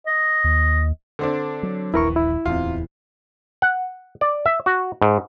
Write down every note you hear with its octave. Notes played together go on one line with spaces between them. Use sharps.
D#5
D#2
D3 C4 D4
F#3
D#1 A#1 D#2 E3 E4 A#4 C#6
E4
D1 E2 C3 F4
F#5
D5
E5
F#4
G#2